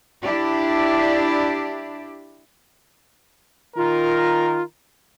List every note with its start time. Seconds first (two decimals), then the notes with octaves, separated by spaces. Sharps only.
0.22 D4 E4 G4 D5
3.76 D#3 F4 A#4